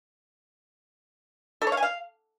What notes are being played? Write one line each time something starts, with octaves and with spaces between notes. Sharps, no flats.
A4
C#5
F5
G#5
F5